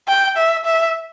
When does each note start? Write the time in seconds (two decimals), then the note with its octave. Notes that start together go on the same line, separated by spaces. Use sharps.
0.08 G5
0.37 E5
0.65 E5